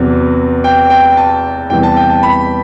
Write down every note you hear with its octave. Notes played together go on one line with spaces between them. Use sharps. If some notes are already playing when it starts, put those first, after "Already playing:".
Already playing: E2 C3 F#3 B3
G5
G5
A5
E2 C3 E3 G3 B3 G5
A5
G5
A5
B5